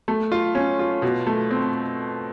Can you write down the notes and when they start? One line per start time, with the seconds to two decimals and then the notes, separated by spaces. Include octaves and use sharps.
0.08 A3
0.32 F4
0.55 C#4
0.79 F4
1.02 B2
1.27 A3
1.51 C4